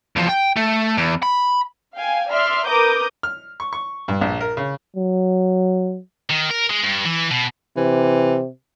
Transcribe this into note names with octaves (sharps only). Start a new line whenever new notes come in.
E2 F3
G5
A3
E2
B5
F5 G5 G#5
D5 E5 C6 F6
A#4 B4 A#5 D6 D#6 G6
F6
C#6
C#6
G2
A#1
A#4
C#3
F#3
D#3
A#4
G#3
G2
E3
B2
C3 E3